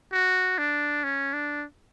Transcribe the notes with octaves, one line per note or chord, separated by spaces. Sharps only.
F#4
D4
C#4
D4